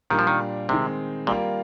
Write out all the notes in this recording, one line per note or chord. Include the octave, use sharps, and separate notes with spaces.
A#2 D#3 G3 D4 F4 A#4
F3
D#3
C3 D#3 G#3 C4
A#2 G3 A#3 F4 A#4